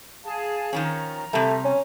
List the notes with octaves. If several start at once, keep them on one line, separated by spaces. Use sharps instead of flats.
G#4 F5 A5
D#3 F3 C#4 A#5
C3 G3 A3
C#4